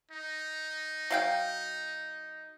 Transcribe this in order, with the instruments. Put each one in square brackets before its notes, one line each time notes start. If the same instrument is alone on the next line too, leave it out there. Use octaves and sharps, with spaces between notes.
[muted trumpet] D#4
[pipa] F#3 F5 G5